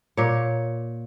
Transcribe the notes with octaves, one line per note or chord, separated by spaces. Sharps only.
A#2 C#5